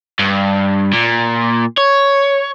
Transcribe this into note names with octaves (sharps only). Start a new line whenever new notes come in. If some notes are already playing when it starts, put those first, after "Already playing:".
G2
A#2
C#5